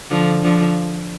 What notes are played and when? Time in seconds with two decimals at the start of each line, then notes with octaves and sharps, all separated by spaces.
0.10 D3 F3
0.43 D3 F3